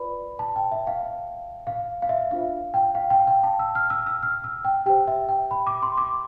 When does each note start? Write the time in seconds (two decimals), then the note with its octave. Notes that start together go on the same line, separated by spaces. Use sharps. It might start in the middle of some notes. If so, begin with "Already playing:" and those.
Already playing: F4 B4 D5 B5
0.39 A5
0.56 G5
0.72 E5
0.87 F5
1.67 F5
2.02 F5
2.09 E5
2.31 D4 F4 C5 F5
2.74 G5
2.95 F5
3.10 G5
3.27 G5
3.43 A5
3.59 E6
3.75 F6
3.90 E6
4.07 E6
4.23 F6
4.44 E6
4.65 G5
4.86 G4 C5 G5
5.08 E5
5.29 G5
5.51 B5
5.67 D6
5.82 C6
5.97 D6